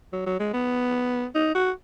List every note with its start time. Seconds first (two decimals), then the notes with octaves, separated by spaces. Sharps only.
0.13 F#3
0.26 F#3
0.40 G#3
0.53 B3
1.35 D#4
1.55 F#4